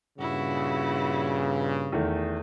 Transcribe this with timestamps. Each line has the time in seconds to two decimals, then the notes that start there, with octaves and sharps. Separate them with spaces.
0.19 G2 A#2 C#3 E4 F#4
1.92 E2 D#3 A3